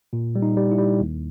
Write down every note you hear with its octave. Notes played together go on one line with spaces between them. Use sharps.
A#2
G3
D#4
G3
E4
G3
D#2